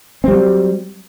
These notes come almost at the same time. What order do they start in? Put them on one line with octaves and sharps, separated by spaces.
C4 G3 F#3